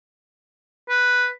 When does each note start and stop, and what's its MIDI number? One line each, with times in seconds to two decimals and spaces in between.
0.89 1.28 71